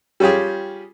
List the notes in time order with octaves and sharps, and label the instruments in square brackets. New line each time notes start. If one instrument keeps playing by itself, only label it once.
[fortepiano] G3 C#4 F4 G4 G#4